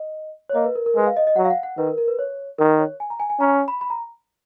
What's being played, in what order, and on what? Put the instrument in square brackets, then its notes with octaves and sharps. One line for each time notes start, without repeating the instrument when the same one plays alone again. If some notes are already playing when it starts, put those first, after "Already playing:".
Already playing: [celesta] D#5
C#5
[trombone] A#3 [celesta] D#5
[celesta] B4
A#4
A#4
[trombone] G#3 [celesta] B4
[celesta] F5
D#5
D#5
[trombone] F#3 [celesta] F#5
[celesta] F5
F#5
F#5
[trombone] D#3 [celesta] B4
[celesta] A#4
A#4
B4
C#5
[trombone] D#3 [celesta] A#4
[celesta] C#5
G#5
A#5
G#5
G#5
[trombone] C#4 [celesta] A#5
[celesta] B5
B5
A#5